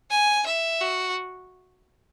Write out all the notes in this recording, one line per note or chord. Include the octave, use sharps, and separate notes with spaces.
G#5
E5
F#4